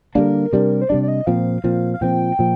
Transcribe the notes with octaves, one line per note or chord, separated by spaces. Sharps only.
D3 G3 A#3 D4 A#4
C3 G3 D4
C5
C3 G3 D4 D5
D5
D#5
A#2 F3 C4 F5
A#2 F3 C4
F5
A#2 F3 C4 G5
A#2 F3